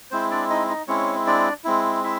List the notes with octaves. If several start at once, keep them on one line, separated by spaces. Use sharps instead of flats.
G#3 C4 E4 C5
D4 D5
D#4 D#5
D#4 D#5
G#3 C4 C#4 E4 C#5
D4 D5
G#3 C4 E4
E4 E5